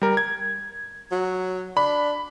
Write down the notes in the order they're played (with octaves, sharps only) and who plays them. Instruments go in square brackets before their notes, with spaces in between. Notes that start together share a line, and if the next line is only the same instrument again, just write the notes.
[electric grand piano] G3 A#4
G#6
[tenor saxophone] F#3
[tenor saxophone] D4 [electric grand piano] B5